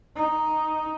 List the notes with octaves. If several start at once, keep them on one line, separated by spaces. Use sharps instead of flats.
D#4